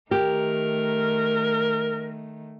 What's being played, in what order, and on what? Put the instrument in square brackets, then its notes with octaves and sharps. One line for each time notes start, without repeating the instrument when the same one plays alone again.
[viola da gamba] D#3 A3 [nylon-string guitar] G4 [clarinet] A#4